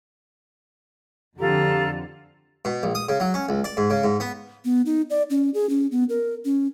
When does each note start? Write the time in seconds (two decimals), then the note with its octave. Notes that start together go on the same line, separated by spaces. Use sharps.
1.39 F2 D3 F4 G4 A4 A#5
2.65 B2
2.83 A#1
2.95 D#6
3.09 C#3
3.20 F#3
3.34 C#4
3.49 C#2
3.64 D5
3.77 G#2
3.90 C#3
4.04 G#2
4.20 B3
4.65 B3
4.86 D#4
5.10 D5
5.30 C#4
5.54 G#4
5.70 C#4
5.92 B3
6.09 A#4
6.45 C#4